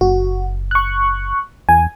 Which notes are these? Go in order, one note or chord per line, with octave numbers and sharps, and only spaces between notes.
F#1 F#4
C#6 F#6
E2 G#5